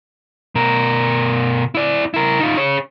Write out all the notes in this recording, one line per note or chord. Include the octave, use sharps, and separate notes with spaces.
B2 A#4
E4 D5
E4 A#4
D#4 F4
G#4 C#5